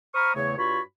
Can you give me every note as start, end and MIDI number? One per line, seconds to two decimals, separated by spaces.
0.15 0.35 72
0.15 0.35 82
0.15 0.35 83
0.15 0.35 85
0.15 0.35 87
0.15 0.35 89
0.35 0.57 40
0.35 0.57 49
0.35 0.57 57
0.35 0.57 73
0.58 0.80 43
0.58 0.80 65
0.58 0.80 66
0.58 0.80 73
0.58 0.80 83
0.58 0.80 85